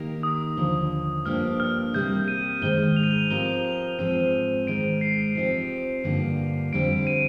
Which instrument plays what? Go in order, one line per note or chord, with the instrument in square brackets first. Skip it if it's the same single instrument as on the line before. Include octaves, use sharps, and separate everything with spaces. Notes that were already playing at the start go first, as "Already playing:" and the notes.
Already playing: [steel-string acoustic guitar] D#3 A#3 D#4 G4 A#4
[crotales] D#6
[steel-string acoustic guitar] D#2 D3 F3
[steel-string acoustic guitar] G2 F3 A#3 D4 G4 [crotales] F6
[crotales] F6
[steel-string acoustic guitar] C3 G3 A#3 [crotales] G6
[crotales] D#7
[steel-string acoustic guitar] G#2 D#3 G#3 [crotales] G7
[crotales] F7
D#7
F7
[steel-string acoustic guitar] F3 C4 G4 A#4 [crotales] G7
[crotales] F7
[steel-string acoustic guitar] G#2 F3 C4 [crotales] D#7
[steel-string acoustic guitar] G#2 D#3 G#3 [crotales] D7
[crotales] C7
[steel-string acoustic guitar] F3 C4 D#4 G4
G2 D3 F3 A#3 F4
[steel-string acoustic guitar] F2 D3 G3 C4 G4 [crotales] D7
[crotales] D#7